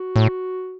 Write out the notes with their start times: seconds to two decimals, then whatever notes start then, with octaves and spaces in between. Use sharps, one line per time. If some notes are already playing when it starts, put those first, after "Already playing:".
Already playing: F#4
0.16 A2